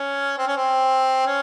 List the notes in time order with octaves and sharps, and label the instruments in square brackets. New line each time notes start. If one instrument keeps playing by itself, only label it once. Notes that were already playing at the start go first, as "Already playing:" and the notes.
Already playing: [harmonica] C#4
C4
C#4
C4
C#4